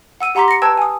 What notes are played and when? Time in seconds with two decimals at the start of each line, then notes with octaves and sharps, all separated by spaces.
0.20 F#5 E6 D#7
0.35 G4 F#5 A#5 C6 D6 B6
0.48 A#6 C#7
0.62 B4 G5 A5 E6 G#6
0.78 G#5 D#6